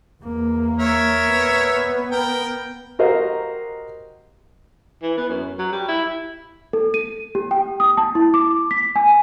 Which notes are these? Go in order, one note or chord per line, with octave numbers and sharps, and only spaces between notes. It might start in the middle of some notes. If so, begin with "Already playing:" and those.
E2 A#3
A#4 C#5 E5
B3
A#4 G5
F#4 G4 A#4 C5 D#5 F5
E3
B3
F#2
F#3
G3
E4
A4
D#7
G4
G5
D#6
A5
E4
D6
B6
G#5